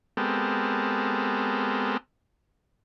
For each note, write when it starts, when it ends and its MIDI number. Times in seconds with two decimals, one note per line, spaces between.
0.17 1.97 56
0.17 1.97 59
0.17 1.97 60
0.17 1.97 67
0.17 1.97 69
0.17 1.97 70